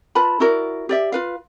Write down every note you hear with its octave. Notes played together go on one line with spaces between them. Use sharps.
F4 B4 A5 B5
E4 F#4 A#4 D5
G4 D5 E5
F4 B4 F5